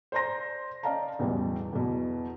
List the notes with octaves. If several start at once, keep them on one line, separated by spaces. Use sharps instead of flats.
C5 D5 A#5 C6 A#6
C#4 D5 D#5 F5 A5 A#5
A1 E2 B2 E3 G3
E2 B2